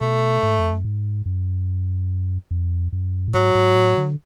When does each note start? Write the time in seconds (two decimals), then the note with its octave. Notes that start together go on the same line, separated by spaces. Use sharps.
0.01 B2 A3
0.43 G#2
0.59 F2
0.72 F#2
0.85 G#2
1.26 F#2
2.51 F2
2.92 F#2
3.28 A2
3.34 G#2 F#3
3.55 G#2
3.75 A2
3.97 D3